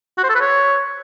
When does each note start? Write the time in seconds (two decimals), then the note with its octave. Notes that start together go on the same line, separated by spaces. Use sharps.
0.18 F#4
0.23 C5
0.29 A4
0.35 B4
0.41 C#5